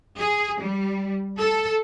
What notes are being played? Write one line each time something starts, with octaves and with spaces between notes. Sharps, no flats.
G#4
G3
A4